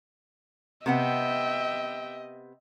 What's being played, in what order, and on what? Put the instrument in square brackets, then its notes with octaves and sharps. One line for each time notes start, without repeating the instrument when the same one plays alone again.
[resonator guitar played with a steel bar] C3 B3 F#5 [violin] D#5 [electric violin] E5 G5